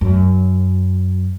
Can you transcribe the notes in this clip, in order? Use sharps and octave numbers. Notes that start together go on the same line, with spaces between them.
F#2